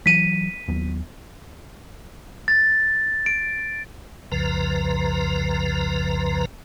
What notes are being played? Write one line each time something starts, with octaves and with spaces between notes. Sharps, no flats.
E3 F#3 B6 D#7
D#2 F#3 B3
A6
D7
C2 F2 C#3 F3 B4 A#5